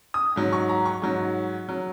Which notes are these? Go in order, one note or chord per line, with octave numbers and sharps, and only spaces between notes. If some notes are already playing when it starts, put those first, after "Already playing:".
D#6
G#2 F#3
C#6
A#5
C#6
G#2 F#3
F#3